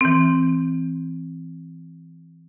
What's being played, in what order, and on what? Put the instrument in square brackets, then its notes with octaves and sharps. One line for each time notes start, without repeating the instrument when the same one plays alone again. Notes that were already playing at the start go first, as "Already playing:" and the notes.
[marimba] E3 C4